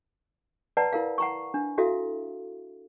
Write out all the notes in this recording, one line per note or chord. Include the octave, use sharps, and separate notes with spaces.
B4 D5 F#5 A5 A#5
E4 A#4 F5
F#5 A#5 C#6
D4
E4 F#4 A4 E5 F5